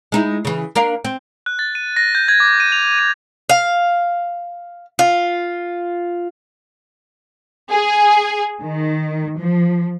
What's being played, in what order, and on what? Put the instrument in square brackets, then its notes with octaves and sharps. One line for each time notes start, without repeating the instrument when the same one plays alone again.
[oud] G#3 D#4 E4
C#3 E3
A#3 D4 F5
C4
[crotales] F#6
A6
D#7
A#6
G6
G#6
D6
D#7
F7
D#7
[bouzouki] F5
F4
[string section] G#4
D#3
F3